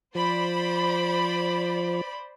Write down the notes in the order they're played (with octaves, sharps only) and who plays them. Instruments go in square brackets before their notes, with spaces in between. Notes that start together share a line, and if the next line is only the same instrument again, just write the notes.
[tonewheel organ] F3 [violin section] C5 D5 B5